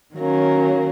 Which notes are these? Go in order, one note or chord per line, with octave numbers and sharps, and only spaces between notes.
D#3 F#3 A#3 C#4